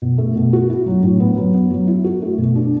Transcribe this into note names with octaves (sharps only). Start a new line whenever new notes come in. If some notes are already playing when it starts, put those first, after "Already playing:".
B2
A3
B2
F#4
E4
F#3
A2
B3
F#3
B3
F#3
E4
F#4
A3
B2
D4